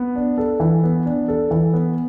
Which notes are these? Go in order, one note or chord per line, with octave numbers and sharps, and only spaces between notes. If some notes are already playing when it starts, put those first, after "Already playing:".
Already playing: B3
D4
A4
E3
B3
D4
A4
E3
B3